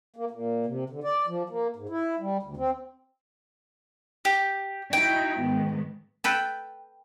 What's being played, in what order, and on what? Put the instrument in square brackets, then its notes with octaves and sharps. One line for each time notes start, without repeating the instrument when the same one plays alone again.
[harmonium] A#3
A#2
C3
D3
D5
F3
A#3
G#2
E4
G3
D2
C4
[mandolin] G4
[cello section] D#4 E4 F#4 [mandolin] G5
[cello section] G#2 D#3 B3
[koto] A4 B4 G5